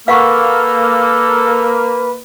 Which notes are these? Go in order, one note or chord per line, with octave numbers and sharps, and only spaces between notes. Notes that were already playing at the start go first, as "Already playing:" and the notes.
A#3 A4 B4 F5 F#5 C#6